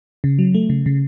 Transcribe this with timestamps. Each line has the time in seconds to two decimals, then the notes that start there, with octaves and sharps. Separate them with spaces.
0.24 C#3
0.39 F#3
0.54 A3
0.70 C#3
0.86 C#3